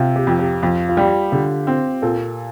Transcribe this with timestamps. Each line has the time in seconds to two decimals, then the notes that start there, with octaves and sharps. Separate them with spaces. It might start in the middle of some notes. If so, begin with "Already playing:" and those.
Already playing: C3 F4
0.16 G4
0.27 F2
0.39 G4
0.63 F2 F4
0.89 F4
0.97 G3 G4
1.32 D3 G4
1.67 C4
2.02 A#2 A4